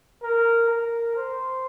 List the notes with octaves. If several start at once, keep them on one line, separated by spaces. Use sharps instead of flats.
A#4
A#4
C5